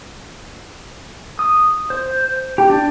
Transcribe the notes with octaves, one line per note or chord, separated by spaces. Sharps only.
D#6
C5
G4
D4